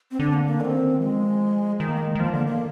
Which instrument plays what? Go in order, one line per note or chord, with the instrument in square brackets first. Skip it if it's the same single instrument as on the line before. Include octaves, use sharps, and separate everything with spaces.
[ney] C4
[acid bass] D3 [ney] D4
[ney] A#3
A#3
[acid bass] D#3 [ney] D4
[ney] C4
[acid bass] F3 [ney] G#3
[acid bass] D#3 [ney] G#3
[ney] A#3
G#3
[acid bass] D#3
[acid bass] F3 [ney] A#3
[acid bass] D3 [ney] A#3
[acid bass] D#3 [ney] A#3